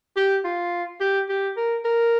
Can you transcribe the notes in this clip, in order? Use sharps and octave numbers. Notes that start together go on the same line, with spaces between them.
G4
F4
G4
G4
A#4
A#4